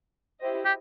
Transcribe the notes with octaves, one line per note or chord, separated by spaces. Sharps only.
E4 G4 C5 D#5
G4